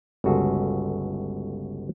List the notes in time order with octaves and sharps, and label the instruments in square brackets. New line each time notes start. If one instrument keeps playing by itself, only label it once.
[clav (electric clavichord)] G1 C#2 F#4 G#4 A4